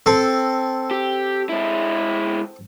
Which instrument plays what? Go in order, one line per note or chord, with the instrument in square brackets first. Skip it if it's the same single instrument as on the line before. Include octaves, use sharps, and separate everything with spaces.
[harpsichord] C4 A4
[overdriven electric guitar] G4
G#3 E4